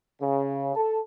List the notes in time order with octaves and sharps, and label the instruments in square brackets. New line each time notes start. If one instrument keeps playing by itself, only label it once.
[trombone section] C#3
A4